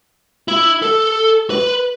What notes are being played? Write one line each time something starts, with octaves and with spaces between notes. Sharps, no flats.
E4
A4
B4